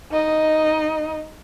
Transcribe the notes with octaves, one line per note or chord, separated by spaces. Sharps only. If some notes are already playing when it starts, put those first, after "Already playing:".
D#4 D#5